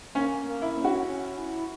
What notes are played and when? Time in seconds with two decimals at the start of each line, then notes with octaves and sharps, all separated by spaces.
0.15 A#3 C#4
0.47 A#3
0.62 E4
0.77 C#4
0.84 F#4
1.07 C#4
1.38 E4